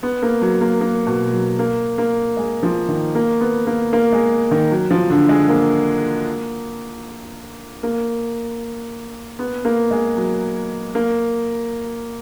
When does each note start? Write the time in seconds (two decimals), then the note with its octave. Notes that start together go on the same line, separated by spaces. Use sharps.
0.03 B3
0.22 A#3
0.42 F#3
0.61 A#3
0.81 A#3
1.07 B2
1.33 F#3
1.59 A#3
1.98 A#3
2.37 G#3
2.63 F3
2.89 D#3
3.15 A#3
3.41 B3
3.67 A#3
3.93 A#3
4.12 G#3
4.51 D#3
4.71 F#3
4.91 F3
5.10 D3
5.29 G#3
5.49 A#3
7.83 A#3
9.39 B3
9.65 A#3
9.91 G#3
10.17 F#3
10.95 A#3